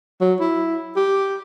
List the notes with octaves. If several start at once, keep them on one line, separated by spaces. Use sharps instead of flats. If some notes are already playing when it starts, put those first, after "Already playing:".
F#3
E4
G4